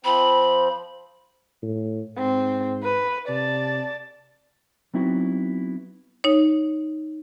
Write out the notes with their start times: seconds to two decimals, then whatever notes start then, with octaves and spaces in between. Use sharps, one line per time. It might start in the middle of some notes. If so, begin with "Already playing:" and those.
0.05 F3 C4 B5
1.62 A2
2.18 G#2 C4
2.83 B4
3.28 C3 D5 A5
4.94 F#3 B3 C4 D#4 E4 F#4
6.24 D#4 C#5